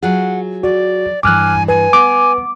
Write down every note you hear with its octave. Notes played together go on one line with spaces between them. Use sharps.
F#3 F4 G#4 F#5
F#4 D5
G2 E3 G#5 D6 F6 F#6
B4 G#5
B3 D6